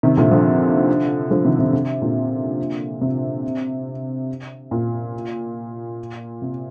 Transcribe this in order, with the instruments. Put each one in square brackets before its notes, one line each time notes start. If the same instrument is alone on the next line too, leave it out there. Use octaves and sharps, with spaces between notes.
[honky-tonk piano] C3 D#3
A#2 D3
D3 F3
D3 F3
C3 D#3
C3
C3
A#2 D3
C3
A#2
C3